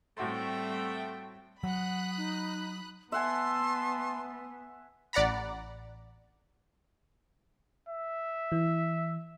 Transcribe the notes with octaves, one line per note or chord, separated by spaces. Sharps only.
A2 G3 A3 C4 F#4 E5 G5 C6
F#3 F#5 B5 D#6 F#6
D#4
B3 E5 F#5 G#5 A5 C6
A1 D5 F#5 A#5 B5
E5
E3